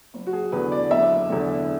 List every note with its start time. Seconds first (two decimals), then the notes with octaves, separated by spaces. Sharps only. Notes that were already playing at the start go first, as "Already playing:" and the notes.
0.14 F#1
0.27 F#4
0.33 G#4
0.52 E2 D3 B4
0.72 D5
0.91 F#1 E5
1.30 E2 D3